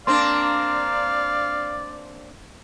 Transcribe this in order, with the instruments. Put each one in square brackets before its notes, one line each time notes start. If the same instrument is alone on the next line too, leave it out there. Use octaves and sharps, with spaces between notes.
[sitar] A#3 C4 D4 [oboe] D5 [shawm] F5 [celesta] C6